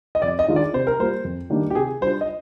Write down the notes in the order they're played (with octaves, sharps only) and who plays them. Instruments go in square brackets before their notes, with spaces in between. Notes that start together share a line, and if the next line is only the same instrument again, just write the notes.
[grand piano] D#5
[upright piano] F2 [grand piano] D5
[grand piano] D#5
[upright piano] D#3 G#3 D4 F4
[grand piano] D5
[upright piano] C3 [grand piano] C5
[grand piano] A#4
[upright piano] G3 A#3 F4 [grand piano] C5
[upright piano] F2
D#3 G3 A#3 D4
[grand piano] G4
[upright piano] C3 [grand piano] G#4
[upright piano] G3 D4 F4 [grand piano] C5
[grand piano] D#5